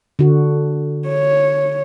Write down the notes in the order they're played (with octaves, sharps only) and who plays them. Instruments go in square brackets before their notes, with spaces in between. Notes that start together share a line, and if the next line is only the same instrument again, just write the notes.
[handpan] D3 F#4
[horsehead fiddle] C#5